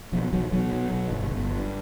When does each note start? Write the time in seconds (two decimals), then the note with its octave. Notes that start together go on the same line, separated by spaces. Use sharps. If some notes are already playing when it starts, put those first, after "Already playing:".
0.12 B1 F3
0.32 B1 F#3
0.52 B1 F#3
0.72 B1
0.91 B1
1.10 G1
1.31 G1
1.51 G2